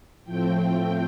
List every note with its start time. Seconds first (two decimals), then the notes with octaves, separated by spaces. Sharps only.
0.25 A2 F3 A3 C4 G5